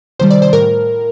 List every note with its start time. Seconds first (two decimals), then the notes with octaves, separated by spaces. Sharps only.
0.19 C3 D#3 G3 C5
0.31 D5
0.42 C5
0.53 A2 A#4